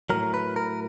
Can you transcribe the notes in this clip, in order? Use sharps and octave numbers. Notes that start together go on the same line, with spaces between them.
A2 F#3 A#4
B4
A#4